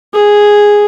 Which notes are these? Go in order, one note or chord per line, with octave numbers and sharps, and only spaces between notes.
G#4